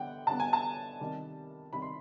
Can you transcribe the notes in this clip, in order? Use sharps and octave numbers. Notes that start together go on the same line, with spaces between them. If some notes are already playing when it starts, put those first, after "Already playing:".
Already playing: D3 G3 B3 F#5 G5
D3 G3 B3 A5
G#5
A5
C3 D#3 G3
C3 D#3 G3 B5
C6